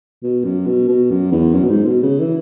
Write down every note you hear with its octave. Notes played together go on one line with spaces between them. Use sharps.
B2
F#2
B2
B2
F#2
E2
F#2
B2
G#2
B2
C#3
E3